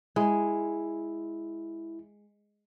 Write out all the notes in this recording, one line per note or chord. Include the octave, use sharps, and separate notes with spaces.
G#3 E4